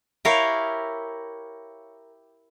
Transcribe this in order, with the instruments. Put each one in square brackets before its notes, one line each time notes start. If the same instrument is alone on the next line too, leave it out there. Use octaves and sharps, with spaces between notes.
[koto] E4 G4 A#4 C#5 F5